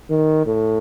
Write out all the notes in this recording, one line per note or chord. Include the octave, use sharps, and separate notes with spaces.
D#3
A2